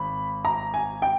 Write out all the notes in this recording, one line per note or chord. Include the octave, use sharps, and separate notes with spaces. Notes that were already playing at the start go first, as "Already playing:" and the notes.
Already playing: G#1 B5
A#5
G#5
G5